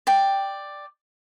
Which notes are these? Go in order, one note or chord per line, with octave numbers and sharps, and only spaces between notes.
D5 G5